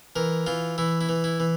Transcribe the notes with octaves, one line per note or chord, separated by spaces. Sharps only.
E3 A#4
E3 F4
E3 E4
E4
E3
E4
E3